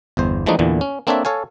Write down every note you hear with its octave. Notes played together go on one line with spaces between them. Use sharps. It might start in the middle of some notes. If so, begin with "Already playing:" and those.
G1 E2 C5
E3 F3 G#3 A3 D4 D#4
E2 A#2 D3 E3
C#4
A#3 C4 D4 A4 C#5 E5
A4 C#5 F5 G#5